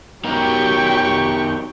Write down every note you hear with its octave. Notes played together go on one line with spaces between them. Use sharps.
F#3 B3 D#4 G4 A#4 G5 C#6